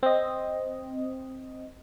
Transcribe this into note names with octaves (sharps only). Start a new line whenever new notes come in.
C4 D#5